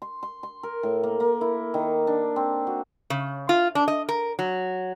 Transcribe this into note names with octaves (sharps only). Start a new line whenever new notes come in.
C6
C6
C6
A#4
A2
A#3
A#3
E4
D#3
D4
C4
F#4
C#3
F4
D4
D#5
A#4
F#3